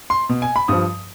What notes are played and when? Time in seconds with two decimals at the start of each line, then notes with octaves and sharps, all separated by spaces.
0.10 C6
0.29 B2
0.42 G#5
0.56 B5
0.68 G2 F3 D#6